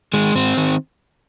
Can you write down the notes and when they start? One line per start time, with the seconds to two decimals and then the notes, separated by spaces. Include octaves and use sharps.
0.14 D#3 G#3
0.35 G#2 C4
0.57 D#3